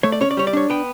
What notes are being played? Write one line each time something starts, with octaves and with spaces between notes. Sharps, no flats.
A3 C#5
D5
C#4 C#5
D5
G3 C#5
D5
D4 C#5
B3 G5